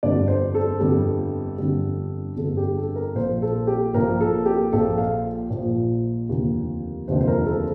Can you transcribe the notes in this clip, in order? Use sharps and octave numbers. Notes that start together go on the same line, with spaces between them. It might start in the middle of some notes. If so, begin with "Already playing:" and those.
G1 F2 D3 G3 D5
C5
A4
G1 F2 D3 G3
G1 F2 D3 G3
G1 F2 D3 G3 A4
G4
A4
A#4
A#1 A#2 F3 C5
A4
G4
A#1 A#2 F3 A#4
A4
G4
A#1 A#2 F3 A4
F5
A#1 A#2 F3
F1 D#2 D3 F3
F1 D#2 D3 F3 C5
C5
A#4
A4